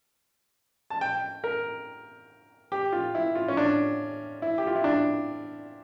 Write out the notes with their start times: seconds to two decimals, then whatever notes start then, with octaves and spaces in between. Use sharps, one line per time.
0.90 A5
1.01 G5
1.44 A#4
2.72 G4
2.93 F4
3.15 E4
3.35 F4
3.48 C#4
3.57 D4
4.42 E4
4.58 G4
4.67 F4
4.76 E4
4.84 D4